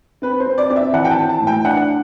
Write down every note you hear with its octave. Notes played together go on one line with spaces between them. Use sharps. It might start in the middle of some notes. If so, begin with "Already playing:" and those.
C4 B4
C5
C4
D5
C4 D5
E5
E3 F#5
G5
A5
E3
A5
A2
G5
D4 F#5